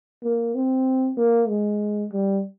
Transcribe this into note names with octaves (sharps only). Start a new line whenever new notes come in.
A#3
C4
A#3
G#3
G3